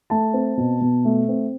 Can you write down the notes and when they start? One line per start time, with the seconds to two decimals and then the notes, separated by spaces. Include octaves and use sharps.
0.10 A3 A5
0.34 C4
0.58 B2
0.81 B2
1.05 A3
1.29 C4